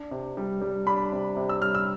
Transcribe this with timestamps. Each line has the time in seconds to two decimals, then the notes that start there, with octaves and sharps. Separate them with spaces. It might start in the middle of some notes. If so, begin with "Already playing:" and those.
Already playing: D4
0.11 C3
0.37 G3
0.62 G3
0.87 D4 B5
1.12 C3
1.37 C3
1.49 E6
1.61 G3 F6
1.75 E6